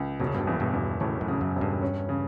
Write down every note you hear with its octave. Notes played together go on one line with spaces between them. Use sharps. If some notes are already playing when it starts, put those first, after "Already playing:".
Already playing: C#2
E1 B2
C#3
G2 B2
E2
G2 B2
E2
E1 A2 C#3
F#2 A2
C#3
F#2
E1
G2
C#4
C#3